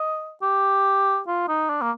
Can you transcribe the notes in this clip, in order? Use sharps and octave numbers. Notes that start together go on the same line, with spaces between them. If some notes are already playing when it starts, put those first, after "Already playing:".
Already playing: D#5
G4
F4
D#4
D4
A#3